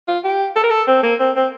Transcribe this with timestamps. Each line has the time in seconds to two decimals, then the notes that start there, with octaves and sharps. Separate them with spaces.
0.08 F4
0.24 G4
0.56 A4
0.64 A#4
0.70 A4
0.88 C4
1.03 A#3
1.20 C4
1.36 C4